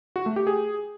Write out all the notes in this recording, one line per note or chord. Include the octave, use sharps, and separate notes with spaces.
F#4
A3
G4
G#4